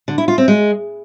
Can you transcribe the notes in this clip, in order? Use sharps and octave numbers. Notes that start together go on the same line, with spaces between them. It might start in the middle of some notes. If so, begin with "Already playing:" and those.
D3
E4
F4
C4
G#3